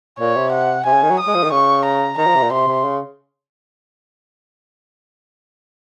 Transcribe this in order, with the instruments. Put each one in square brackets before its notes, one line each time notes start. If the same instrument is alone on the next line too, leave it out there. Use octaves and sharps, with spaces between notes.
[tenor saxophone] A#2 [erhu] C#5
[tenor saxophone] C3
[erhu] F#5
[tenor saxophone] C3 [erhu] G#5
[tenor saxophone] C#3
D#3
F#3
[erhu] D#6
[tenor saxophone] G#3
F3
D#3
[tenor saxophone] C#3 [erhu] C#6
[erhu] A#5
[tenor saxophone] D#3 [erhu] A#5
[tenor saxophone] F3
C3
A#2
[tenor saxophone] C3 [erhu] C6
[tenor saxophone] C3
C#3